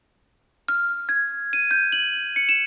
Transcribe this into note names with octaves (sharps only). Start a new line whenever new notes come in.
F6
G#6
D#7
G6
F#7
C#7
E7